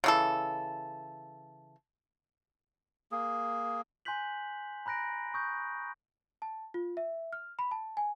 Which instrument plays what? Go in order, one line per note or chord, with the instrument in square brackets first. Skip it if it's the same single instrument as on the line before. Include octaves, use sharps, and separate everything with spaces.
[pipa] C#3 E3 A4
[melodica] A#3 G#4
[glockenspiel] G#5 C6 F#6 G6 B6 F#7
A#5 B5 F#6 A#6 D7
C#6 D#6 G6
[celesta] A5
F4
E5
F6
B5
A5
G#5